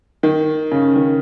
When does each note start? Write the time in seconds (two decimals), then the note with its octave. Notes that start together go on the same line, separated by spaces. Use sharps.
0.23 D#3
0.71 C#3
0.96 D#3